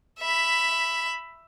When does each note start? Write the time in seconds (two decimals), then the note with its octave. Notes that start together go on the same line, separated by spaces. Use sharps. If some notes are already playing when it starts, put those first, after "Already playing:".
0.20 E5 B5